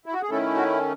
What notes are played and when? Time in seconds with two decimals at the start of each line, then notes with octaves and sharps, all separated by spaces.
0.06 E4
0.13 F#4
0.22 G#4
0.30 D#3 A3 C#4 E4 A4
0.56 F#4